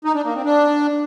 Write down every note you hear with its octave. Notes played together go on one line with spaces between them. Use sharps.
D#4
D4
A#3
C4
D4